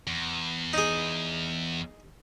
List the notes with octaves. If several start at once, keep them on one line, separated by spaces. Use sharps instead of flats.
E2
D#4 G#4